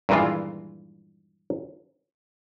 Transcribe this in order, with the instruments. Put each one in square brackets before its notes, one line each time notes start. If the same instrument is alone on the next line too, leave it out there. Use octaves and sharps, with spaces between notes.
[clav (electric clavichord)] G2 A#2 D#3 E3 G#3 F4